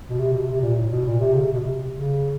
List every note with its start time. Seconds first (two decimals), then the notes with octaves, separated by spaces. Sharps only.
0.09 B2
0.19 C3
0.33 B2
0.47 C3
0.61 A#2
0.76 A2
0.90 B2
1.05 A#2
1.20 C3
1.34 C#3
1.43 C3
1.52 B2
1.61 C3
1.92 C#3